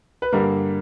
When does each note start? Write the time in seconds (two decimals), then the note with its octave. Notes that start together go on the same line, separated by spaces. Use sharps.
0.22 B4
0.33 G2 D3 G3 A#3 A#4